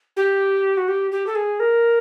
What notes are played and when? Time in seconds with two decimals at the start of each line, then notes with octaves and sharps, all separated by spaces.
0.16 G4
0.77 F#4
0.88 G4
1.11 G4
1.27 A4
1.35 G#4
1.60 A#4